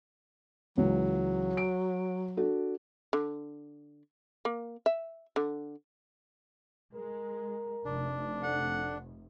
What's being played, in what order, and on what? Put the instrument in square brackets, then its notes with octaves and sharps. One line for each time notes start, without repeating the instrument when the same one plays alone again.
[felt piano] C#2 C#3 E3 [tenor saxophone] F#3
[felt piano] D7
D4 F#4 A4
[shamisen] D3
A#3
E5
D3
[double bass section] G#3 [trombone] A#4
[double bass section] F1 [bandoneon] D4
[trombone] D3 [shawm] F#5